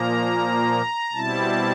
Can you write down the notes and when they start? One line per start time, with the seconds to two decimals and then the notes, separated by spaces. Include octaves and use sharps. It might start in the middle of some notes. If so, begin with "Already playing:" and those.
Already playing: A#2 F3 A#3 A#5
1.12 B2 G3 C4 E4 A5